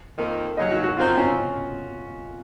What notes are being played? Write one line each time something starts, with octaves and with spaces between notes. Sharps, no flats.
F2 D#3 A#3
D#2 C#3 F#3 D#5
F#4
F#4
F#2 F3 C4 D#4 F4
C#4